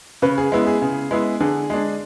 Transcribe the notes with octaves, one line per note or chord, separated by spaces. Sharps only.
C#3 B4
G#4
G#3 B3 E4
G#4
C#3
G#3 B3 E4
D3 G#4
G#3 D4